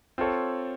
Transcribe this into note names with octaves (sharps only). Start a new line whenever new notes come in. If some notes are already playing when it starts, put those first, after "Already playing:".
C4 F4 A4 C#5